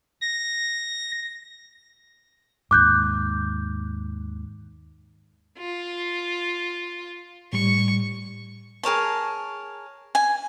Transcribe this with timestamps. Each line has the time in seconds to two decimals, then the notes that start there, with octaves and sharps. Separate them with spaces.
0.21 A#6
2.71 D#2 G#2 D6 F#6 G6
5.59 F4
7.53 A2 G3 C#6
8.83 G#4 A#4 C#5 A5
10.15 G#5